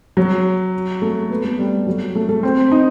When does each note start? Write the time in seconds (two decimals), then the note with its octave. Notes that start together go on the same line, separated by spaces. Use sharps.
0.17 F#3
1.02 A3
1.30 B3
1.45 A3
1.59 G3
1.87 F#3
2.15 A3
2.29 A3
2.43 C4
2.71 D#4